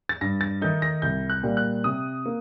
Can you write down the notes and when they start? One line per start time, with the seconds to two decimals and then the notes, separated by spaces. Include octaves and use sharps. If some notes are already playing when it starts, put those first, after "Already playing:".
0.09 A6
0.21 G2 A#6
0.41 A6
0.61 D#3 A3 D#4 G6
0.82 A#6
1.02 C2 G6
1.30 F#6
1.43 A#2 G3 A#3
1.57 F#6
1.84 C3 D#6
2.26 A#3